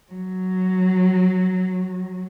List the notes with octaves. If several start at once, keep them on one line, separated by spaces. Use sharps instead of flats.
F#3